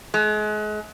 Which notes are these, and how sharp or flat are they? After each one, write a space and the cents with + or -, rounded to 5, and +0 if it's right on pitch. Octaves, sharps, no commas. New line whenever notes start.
G#3 +35